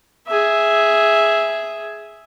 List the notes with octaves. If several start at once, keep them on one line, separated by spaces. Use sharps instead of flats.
G#4 E5